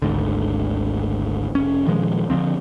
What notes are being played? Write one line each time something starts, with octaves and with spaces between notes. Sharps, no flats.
G#1 D2 G#2 D3
F1 C#4
A#2 D#3 F3 G#3
D3 E3 F3 C4